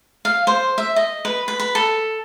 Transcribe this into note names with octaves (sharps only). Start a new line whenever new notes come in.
F5
C5
E5
D#5
B4
B4
B4
A4